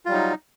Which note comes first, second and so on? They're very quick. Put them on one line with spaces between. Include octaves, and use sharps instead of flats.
F4 G3 F#3 D#4